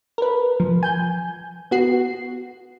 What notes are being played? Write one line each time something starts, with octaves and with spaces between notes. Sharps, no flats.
A#4 B4
F3
G#5 G6
B3 F#4 C7